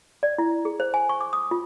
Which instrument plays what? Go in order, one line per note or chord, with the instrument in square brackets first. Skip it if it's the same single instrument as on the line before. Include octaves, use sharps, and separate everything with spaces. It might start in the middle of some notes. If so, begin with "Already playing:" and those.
[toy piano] D5
E4
G#4
C5
G#5
C#6
D6
D#6
F4